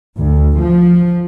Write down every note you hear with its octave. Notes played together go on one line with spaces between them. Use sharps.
D2
F3